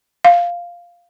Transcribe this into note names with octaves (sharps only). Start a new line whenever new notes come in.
F5